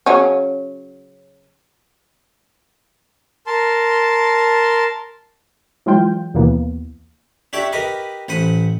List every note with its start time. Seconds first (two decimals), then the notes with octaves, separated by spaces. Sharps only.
0.06 C#3 F#3 C#4
3.47 A#4 A5 C6
5.86 E3 F#3 G#3 F4 G5 G6
6.34 D#2 B2 E3 A#3 B3
7.53 D4 G4 C#5 E5 F#5 G5
7.73 G4 A#4 B4 D#5
8.28 A1 C5 F#5 B5 D#6